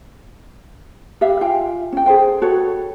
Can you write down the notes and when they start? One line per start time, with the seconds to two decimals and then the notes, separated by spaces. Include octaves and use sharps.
1.21 G4 B4 E5 F5
1.41 F4 F5 G5 G#5
1.92 C#4 G5
2.06 G#4 A4 C5 G5
2.42 F#4 A4 B4 C#5